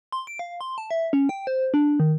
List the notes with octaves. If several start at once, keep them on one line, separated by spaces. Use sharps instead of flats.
C6
D7
F5
C6
A5
E5
C#4
G5
C5
D4
D#3